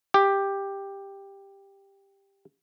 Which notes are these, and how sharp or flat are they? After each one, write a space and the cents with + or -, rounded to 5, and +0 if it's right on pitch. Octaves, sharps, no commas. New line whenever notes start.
G4 +10